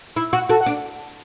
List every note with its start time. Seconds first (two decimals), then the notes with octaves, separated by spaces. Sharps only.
0.16 E4
0.33 F#4
0.49 F#4 A4
0.61 F#5
0.66 D4